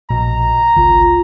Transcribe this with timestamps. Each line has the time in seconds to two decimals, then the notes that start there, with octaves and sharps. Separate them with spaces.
0.10 A#1 B2 A#5
0.77 G#1 C#2 F4